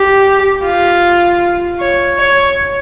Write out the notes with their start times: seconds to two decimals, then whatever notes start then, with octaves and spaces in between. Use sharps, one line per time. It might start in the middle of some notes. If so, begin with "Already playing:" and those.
Already playing: G4
0.65 F4
1.80 C#5
2.19 C#5